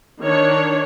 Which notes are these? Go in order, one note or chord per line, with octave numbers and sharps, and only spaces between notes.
D#3 D4 C#5